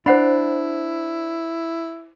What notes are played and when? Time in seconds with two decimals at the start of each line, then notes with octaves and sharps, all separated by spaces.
0.06 D4 E4 C5 F#5 B5